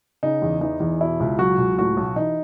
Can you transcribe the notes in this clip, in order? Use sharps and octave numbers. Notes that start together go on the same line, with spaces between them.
C#3 D#4
E2
E3 D#4
E2
B2 E4
C#2
F#3 F#4
C#2
A2 F#4
B1
E3 D#4